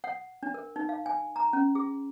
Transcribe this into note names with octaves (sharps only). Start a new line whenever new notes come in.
F#5
D4
A#4
D#4
F5
G#5
A#5
C#4
G#4